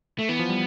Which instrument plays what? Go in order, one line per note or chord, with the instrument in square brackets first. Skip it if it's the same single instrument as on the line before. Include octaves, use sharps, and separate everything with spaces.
[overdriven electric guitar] A3
[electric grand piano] E3 [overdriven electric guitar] B3
[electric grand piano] F3
G3